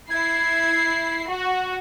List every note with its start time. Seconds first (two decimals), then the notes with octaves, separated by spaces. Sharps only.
0.10 E4 G#6 C7
1.29 F#4